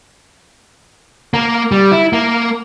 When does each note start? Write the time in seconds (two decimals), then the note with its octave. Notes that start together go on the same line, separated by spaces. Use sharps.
1.34 A#3
1.72 G3
1.92 E4
2.13 A#3